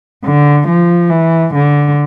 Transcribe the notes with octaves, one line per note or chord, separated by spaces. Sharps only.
D3
F3
E3
D3